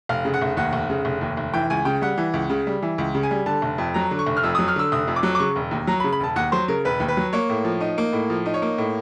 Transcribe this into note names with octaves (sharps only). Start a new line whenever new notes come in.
F1 F5
C#3
F#5
F1
D#2 F#5
F1
C#3
F1
D#2
F1
E3 G5
C#2 G#5
C#3 G5
G3 F#5
E3
C#2
C#3
G3
E3
C#2
C#3
G#5
G3
D3 A5
F1
F2
F#3 A#5
D3
C#6
F1
F6
F2 E6
D#6
F#3
F6
D3 E6
F1 D#6
F2
D6
F#3
D6
C#3 C#6
E1
D#2
F#3 A#5
B5
C#3
B5
E1 A5
D#2 F#5
F#3 C5
C#3 A#4
E1 B4
D#2
B4
F#3
A#3 C#5
A2
F3
D#4
A#3
A2
F3
D#4
C#5
A#3
A2